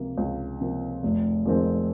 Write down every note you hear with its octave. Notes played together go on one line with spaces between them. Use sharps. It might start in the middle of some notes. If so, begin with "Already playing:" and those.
Already playing: C#2 C3 F3 A#3
C#2
C3 F3 A#3
F1
F2 D#3 G#3 C4